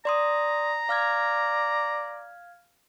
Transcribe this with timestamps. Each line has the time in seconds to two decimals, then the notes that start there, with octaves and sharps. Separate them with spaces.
0.05 D5 A#5 C6 D#6
0.89 D5 F5 F6 G#6